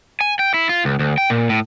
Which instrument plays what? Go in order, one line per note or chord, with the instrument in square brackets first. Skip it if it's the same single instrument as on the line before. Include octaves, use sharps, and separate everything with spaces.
[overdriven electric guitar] G#5
G5
E4
F4
C#2
D2
G5
A#2
A2